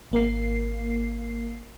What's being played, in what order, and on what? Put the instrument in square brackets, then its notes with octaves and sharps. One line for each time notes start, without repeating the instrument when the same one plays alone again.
[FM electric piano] G#1 A#3 A#4 C7